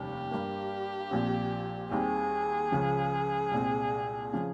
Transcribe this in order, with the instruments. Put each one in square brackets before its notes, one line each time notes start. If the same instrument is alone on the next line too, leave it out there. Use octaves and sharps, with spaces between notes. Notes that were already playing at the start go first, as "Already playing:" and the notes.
Already playing: [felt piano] F1 D#2 G3 C#4 [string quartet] G4
[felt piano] G2 G3 A#3
A#1 A#2 F3 C4
[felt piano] D#2 D#3 G3 C4 [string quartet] G#4
[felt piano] C#2 C#3 F3
C2 A#2 G#3 C4
C#3 F3